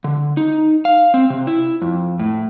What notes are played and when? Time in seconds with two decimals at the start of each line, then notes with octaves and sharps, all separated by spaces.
0.04 D3
0.37 D#4
0.85 F5
1.14 C4
1.30 C3
1.47 E4
1.82 F2
2.19 A2